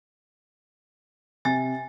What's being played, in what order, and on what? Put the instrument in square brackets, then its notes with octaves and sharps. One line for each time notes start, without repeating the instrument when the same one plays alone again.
[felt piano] C3 A6 [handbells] G#5